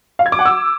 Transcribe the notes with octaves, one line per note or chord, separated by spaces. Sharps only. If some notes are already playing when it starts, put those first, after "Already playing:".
F5
G#6
D6
F#5
E6